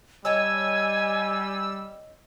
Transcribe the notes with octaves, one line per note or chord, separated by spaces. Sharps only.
G3 C#5 D#5 G#5 A5 E6